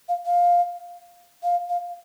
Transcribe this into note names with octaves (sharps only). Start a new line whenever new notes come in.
F5
F5
F5
F5